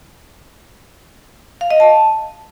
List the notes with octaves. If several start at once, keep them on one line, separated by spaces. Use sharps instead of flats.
F5
D#5
A5